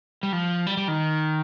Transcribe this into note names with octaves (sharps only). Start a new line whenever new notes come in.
G3
F3
G3
G3
D#3